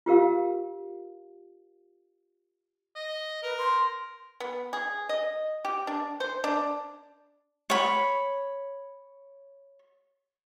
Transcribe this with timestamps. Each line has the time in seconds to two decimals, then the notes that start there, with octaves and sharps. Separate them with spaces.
0.06 F4 G4 A#4 F5
2.95 D#5
3.43 A#4 B4
3.58 C6
4.40 B3
4.73 G#4
5.09 D#5
5.65 G4
5.87 D4
6.20 C5
6.44 D4
7.70 C#5 B5